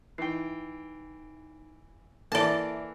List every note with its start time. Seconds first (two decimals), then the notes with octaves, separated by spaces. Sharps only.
0.18 E3 D#4 G5 C7
2.32 E3 A#3 A4 D5 E5 A5